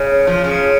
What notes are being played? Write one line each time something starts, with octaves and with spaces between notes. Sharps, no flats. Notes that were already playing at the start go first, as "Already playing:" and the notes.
Already playing: C#3
F3
C#3